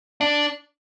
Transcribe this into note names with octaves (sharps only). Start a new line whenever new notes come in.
D4